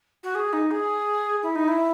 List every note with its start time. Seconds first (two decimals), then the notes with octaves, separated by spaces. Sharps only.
0.23 F#4
0.35 G#4
0.53 D#4
0.71 G#4
1.43 E4
1.55 D#4
1.68 E4